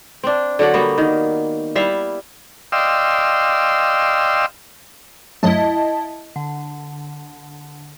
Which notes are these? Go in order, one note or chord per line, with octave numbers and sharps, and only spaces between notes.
C4 D4
D3 F#3 A4 F#5
G3 A#3 B3 F#4
D#3
G3 E4 E5 F5
D5 D#5 F5 G5 C6 E6
G2 F#3 A3 E4 D#5 A5
D3